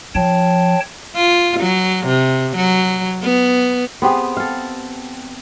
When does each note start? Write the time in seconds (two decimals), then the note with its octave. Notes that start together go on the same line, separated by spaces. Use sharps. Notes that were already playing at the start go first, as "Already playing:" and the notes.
0.15 F3 C#5 G5 A5
1.15 F4
1.60 F#3
2.06 C3
2.56 F#3
3.22 B3
4.02 B3 C4 G4 G#4
4.37 A4 F5